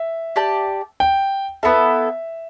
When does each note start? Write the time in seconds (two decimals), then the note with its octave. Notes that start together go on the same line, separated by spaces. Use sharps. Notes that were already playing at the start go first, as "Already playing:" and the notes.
Already playing: E5
0.36 G4 D5 A5
1.00 G5
1.63 B3 E4 A4 E5